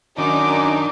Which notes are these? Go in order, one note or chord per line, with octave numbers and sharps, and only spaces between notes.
F#2 D#3 D4 D#4 D6